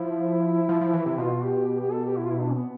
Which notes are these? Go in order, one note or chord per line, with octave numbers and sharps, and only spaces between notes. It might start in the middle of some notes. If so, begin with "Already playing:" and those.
Already playing: F3 E4
F3
F3
E3
C3
B2 F4
G4
G4
G4
A4
G4
E4
F4
E4
D4
B3